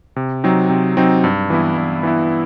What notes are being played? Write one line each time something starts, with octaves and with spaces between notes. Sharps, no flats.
C3
F#3 C4 D#4
C3
F#3 C4 D#4
G2
E3 B3 E4
G2
E3 B3 E4